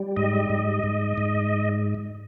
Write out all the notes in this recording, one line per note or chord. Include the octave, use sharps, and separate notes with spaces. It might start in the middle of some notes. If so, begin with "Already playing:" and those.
Already playing: G3
G#2 D#5
G#2
G#2
G#2